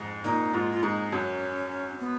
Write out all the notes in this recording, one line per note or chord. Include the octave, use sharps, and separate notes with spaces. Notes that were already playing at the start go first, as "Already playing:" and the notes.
Already playing: F2 G#2 G#3
A#2 A#3 D#4
G#2 G#3 F4
F4
G#2 G#3 D#4
F#2 F#3 C#4
B3